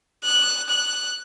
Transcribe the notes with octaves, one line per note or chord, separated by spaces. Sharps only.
F#6
F#6